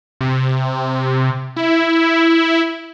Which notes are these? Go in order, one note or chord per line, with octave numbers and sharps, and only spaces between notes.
C3
E4